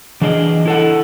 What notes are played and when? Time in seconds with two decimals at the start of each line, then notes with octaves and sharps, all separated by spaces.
0.21 E3 D4 G#4 D#5
0.66 E4 A4 F#5